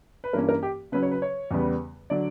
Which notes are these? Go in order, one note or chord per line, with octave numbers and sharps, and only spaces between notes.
B4
G2 E3 A#3 C#4 A#4
A#4
G4
C#3 F#3 C#4 B4
C#5
B4
C#5
E2 C#3 G3 B3
D3 F#3 D5